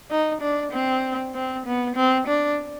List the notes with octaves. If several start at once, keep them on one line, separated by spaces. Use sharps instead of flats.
D#4
D4
C4
C4
B3
C4
D4